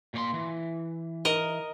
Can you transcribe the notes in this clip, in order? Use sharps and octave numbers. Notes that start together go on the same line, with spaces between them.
A#2 C#5 C6
E3
A#4 D#5